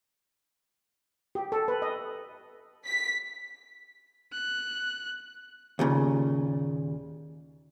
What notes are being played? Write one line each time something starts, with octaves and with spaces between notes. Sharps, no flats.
G4
A4
B4
D#5
B6
F#6
D#2 A#2 C#3